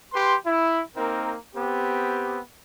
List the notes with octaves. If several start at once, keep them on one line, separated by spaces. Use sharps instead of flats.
G4 B4 C6
E4
A#3 C4 D#4 A#4
B3 C4 G4